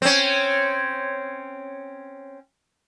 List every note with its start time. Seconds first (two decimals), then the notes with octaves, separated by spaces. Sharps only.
0.02 C4 C#4